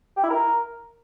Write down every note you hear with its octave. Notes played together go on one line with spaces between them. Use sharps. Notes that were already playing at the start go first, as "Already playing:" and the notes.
G4
E4
A#4